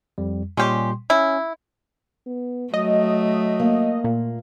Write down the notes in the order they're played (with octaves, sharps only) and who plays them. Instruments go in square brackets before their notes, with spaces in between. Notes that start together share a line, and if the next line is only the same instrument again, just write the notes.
[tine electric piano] F2 G3
[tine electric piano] A#2 G3 C6 [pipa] G#3 C#4 G4
[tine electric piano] C#4 [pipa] E4
[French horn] B3
[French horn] F#3 [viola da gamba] A3 [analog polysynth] D#5
[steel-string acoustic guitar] A#3
[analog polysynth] A#2